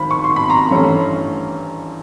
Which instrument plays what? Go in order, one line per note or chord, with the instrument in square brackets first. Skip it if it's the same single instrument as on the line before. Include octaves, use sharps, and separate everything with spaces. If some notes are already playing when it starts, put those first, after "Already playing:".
Already playing: [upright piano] G#1 D#3 B5
C#6
C6
B5
A#5 C6
A1 G2 E3 A3 C#4